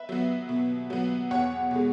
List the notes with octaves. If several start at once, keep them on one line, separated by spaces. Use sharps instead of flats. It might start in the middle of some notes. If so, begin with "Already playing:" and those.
Already playing: B4 E5
F#3 B3
B2
F#3 B3
E2 C#5 F#5
B2 G#3